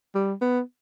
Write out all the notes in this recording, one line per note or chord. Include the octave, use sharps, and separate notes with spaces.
G3
B3